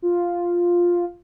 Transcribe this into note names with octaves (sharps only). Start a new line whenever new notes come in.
F4